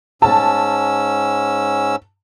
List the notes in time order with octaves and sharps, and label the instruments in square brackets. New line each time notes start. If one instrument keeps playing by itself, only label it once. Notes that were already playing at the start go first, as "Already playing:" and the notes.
[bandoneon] G#2 C#4 E6 [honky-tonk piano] A5